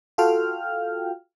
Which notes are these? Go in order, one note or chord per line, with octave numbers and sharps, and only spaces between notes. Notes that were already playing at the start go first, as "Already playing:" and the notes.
F4 F#4 A4 F5 G5 F6